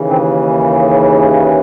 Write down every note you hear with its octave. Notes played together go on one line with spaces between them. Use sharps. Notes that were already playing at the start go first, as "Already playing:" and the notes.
Already playing: D#2 C#3 E3
C4